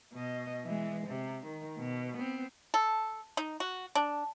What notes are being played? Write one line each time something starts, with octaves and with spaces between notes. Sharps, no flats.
B2 D#5
E3 G#3
C3
D#3
B2
B3 C4
A4
D#4
F#4
D4